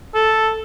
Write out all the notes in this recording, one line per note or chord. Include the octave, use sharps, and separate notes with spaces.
A4